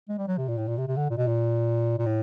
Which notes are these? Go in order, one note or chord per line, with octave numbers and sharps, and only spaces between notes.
G#3
G3
F#3
C3
A#2
A2
A#2
C3
C3
D3
A#2
B2
A#2
A#2
A2